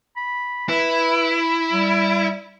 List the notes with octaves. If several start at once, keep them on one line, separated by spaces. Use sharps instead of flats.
B5
E4 B4
G3